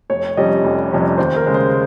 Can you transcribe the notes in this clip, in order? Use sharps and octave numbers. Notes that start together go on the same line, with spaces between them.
F1 C#5
F2 C3 G3 C#4 D#5
F1
F2 C3 G3 C#4
D#2 C5
A#4
C#3 G#3
C5